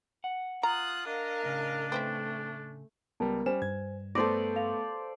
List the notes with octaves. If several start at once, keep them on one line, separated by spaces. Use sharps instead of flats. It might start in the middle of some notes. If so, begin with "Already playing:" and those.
F#5
F4 A#5 D#6 F#6
D4 A#4 D#5 F5
A2 C#3
A3 C4 B4 E5
C#2 G3 B3 A#4 A5
G3 C#4 C5 G#5 E7
G2 G#6
A3 B3 A4 C5 D5 A#6
F5 F7